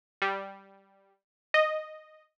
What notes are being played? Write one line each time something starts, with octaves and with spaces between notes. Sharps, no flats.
G3
D#5